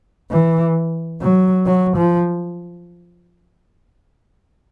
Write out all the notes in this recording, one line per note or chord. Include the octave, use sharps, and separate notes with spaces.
E3
F#3
F#3
F3